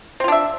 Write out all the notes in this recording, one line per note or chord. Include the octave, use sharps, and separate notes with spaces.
C4 D4 F4 E5